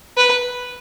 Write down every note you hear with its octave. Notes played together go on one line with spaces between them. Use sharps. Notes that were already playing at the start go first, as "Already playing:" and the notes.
B4